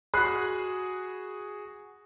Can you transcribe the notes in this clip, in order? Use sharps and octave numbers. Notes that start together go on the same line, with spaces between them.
F#4 G#4 B5 F#6 C7